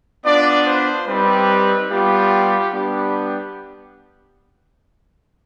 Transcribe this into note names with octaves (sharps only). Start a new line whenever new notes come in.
B3 D4 F4 D5
C5
G3 C4 D#4 G4 B4
G3 B3 F4 G4
G3 B3 D4 G4